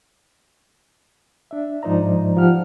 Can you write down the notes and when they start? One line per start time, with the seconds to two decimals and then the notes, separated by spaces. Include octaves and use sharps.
1.51 D4 E5
1.83 G#2 F3 D#4 C5 D5 A#5
2.36 F3 G4 F#5 F6